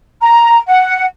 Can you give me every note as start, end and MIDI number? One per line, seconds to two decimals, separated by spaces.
0.21 0.57 82
0.68 1.04 78